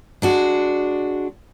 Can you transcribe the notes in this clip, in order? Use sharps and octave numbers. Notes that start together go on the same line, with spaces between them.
G#3 D4 F#4